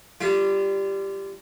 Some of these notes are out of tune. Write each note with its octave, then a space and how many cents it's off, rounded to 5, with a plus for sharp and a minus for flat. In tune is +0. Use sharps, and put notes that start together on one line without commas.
G3 +0 F4 -35